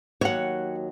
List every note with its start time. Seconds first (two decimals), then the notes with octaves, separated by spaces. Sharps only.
0.21 D#2 F#3 C#5 F#5